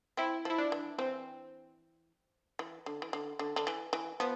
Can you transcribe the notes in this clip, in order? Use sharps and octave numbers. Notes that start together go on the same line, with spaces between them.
C4 E4
F3 E4
D4
E3
E3 C4
E3
D3
E3
D3
D3
D3
E3
E3
F3 B3